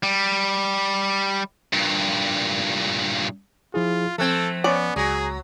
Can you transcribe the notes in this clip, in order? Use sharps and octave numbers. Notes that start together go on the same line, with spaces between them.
G3
G2 A#2
F3 E4 F4 G#4
F3 A3 C4 A4 F#6 G#6
B3 C#4 D5
C#2 F#3 G#4